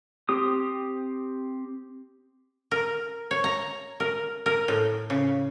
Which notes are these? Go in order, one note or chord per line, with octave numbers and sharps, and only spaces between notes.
C4 G4 D#6
A#4
C#5
A#5
A#4
A#4
A2
C#3